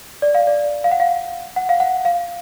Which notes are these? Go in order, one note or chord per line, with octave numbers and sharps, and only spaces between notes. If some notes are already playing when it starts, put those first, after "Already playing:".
D5
F5
D5
F5
F#5
F5
F#5
F5
F#5
F5